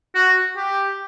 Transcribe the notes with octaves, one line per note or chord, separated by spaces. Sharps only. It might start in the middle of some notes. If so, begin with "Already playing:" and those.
F#4
G4